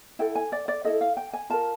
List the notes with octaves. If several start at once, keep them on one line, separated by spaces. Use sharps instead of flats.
E4 A4 G5
G#5
D5
D5
E4 A4 D#5
F5
G5
G#5
F4 A#4 A5